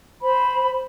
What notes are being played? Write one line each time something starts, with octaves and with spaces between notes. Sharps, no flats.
C5 B5